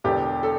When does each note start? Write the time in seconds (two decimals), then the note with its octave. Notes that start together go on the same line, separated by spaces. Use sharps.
0.04 E1 E2 D3 G4
0.43 A4